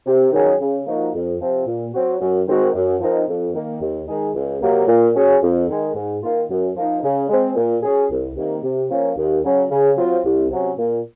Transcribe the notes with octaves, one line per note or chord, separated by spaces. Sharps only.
C3
D#3 F#3 C#4 G#4
C#3
F3 A#3 D#4 F#4
F2
C3 F3 C4
A#2
F#3 C4 F#4
F#2
D#3 G#3 C4 F#4
F#2
F3 C4 D#4 A#4
F2
D#3 A#3
D#2
D#3 G#3 D#4 G#4
C#2
C3 F#3 A#3
A#2
F#3 C#4 G#4
F2
D#3 G#3
G#2
D#3 A#3 F4
F#2
F3 A#3 D#4
C#3
G#3 C4
A#2
F#3 C#4 G#4
C2
C3 D#3 A#3
C3
F3 A#3 C#4
D#2
C#3 F#3 C#4
C#3
F#3 C4 F4
C2
C3 F#3 C#4
A#2